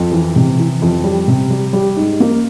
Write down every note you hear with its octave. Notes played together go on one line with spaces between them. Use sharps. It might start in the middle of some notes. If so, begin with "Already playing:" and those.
Already playing: F2
E3
C3
E3
F2
G3
C3
G3
G3
G#2
A#3